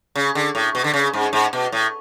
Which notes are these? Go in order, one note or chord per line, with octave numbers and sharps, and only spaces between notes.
C#3
D3
A2
B2
D3
C#3
G#2
G#2
B2
A2